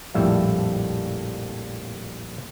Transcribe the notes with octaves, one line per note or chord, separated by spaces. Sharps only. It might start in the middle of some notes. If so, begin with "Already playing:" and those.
A#1 F2 A2 G3 E5